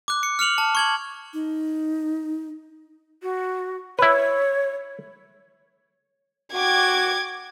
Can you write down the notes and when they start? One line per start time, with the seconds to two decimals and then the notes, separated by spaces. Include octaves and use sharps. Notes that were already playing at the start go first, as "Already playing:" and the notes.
0.08 D6 F#6
0.23 C#7
0.39 F6 C#7 F7 F#7
0.58 A5
0.75 C#6 G#6 F#7
1.34 D#4
3.22 F#4
3.99 E4 B4 C#5
6.54 F#4 G5 D6 G#6